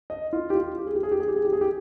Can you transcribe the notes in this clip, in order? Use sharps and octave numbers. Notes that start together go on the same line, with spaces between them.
D#5
F4
G4
F4
G4
G#4
G4
G#4
G4
G#4
G4
G#4
G4
G#4
G4